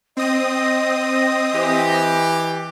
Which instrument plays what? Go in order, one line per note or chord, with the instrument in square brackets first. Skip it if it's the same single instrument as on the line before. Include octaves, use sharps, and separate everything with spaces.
[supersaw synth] C4 D#6 [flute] D#5
[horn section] E3 G4